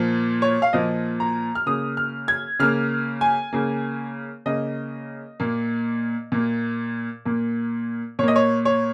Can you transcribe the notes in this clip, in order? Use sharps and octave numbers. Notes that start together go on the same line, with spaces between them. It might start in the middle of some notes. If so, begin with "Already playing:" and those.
Already playing: A#2 F3 A#3
C#5
F5
A#2 F3 A#3 D#5
A#5
F6
C#3 A#3 D#6
F6
G#6
C#3 A#3 F6
G#5
C#3 A#3
C#3 A#3 D#5
A#2 A#3
A#2 A#3
A#2 A#3
A#2 A#3 C#5 D#5
C#5
C#5